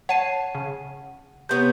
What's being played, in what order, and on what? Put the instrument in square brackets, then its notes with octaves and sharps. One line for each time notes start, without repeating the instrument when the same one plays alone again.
[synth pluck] C#5 A5 C7 [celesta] F#5 D#7
[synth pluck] C#3
[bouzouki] C3 B3 C#5 [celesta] G6